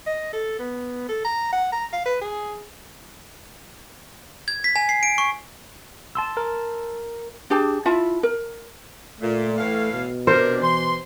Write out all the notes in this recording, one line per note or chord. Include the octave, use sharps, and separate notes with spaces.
D#5
A4
B3
A4
A#5
F#5
A#5
F5
B4
G#4
G#6
B6
G#5
C7
D7
C#6
A5 C6 E6
A#4
D4 G4 G#4 A5
E4 F4 E5 A5
A#4
A#2 A3
A2 E3 F5
B2
C3 D4 A#4 C5
E3 C6